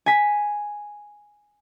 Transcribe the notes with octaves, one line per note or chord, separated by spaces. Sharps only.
G#5 B6